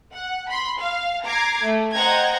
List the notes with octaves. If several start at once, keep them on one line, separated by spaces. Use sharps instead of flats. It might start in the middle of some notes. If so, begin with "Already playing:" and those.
F#5
B5 C6
F5
A#5 D6 G#6 C7
A3
C5 D#5 F#5 G5 A#5 G#6